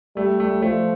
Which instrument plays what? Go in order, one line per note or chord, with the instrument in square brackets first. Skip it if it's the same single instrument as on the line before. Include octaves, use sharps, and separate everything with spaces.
[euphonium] G3 [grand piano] A3
[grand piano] A3
[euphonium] F3 [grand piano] A3